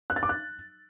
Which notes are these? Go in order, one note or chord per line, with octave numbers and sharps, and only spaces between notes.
F#6
A6
D6
F#6